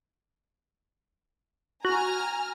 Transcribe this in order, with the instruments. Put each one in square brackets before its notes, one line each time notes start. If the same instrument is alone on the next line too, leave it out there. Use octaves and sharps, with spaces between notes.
[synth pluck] F#4 [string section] G#5 A#5 F6